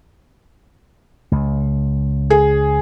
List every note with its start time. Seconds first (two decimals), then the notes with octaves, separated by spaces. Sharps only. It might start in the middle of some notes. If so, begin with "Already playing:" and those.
1.32 C#2
2.30 G#4